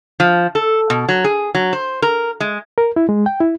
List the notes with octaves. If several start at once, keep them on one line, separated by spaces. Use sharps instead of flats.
F3
A4
B2
F#3
G#4
F#3
C5
A#4
G#3
A#4
E4
G#3
G5
E4